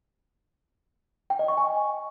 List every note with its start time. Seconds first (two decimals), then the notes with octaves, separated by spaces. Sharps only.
1.30 G5
1.39 D#5
1.48 C#6
1.57 G#5